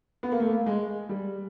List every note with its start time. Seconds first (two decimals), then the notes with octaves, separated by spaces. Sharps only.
0.23 B3
0.32 A#3
0.40 A3
0.48 A#3
0.66 G#3
1.09 G3